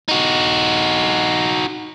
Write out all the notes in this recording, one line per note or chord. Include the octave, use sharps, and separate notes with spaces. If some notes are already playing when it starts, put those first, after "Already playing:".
D#4 F#4